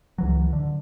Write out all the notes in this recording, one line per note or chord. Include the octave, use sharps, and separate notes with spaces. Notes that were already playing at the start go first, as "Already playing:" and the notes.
C#2 E3 F#3
D3